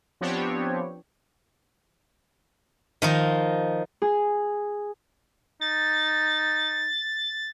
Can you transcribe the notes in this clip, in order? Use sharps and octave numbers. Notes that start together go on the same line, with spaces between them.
F3 B3 C4 D4 G4 C#5
D#3 F3 D#4
G#4
D#4 A6